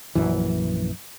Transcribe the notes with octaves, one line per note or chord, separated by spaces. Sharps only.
A#1 F#2 E3